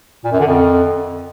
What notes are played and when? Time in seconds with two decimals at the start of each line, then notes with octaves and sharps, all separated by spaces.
0.24 A#2
0.32 F#2
0.40 D3
0.47 F2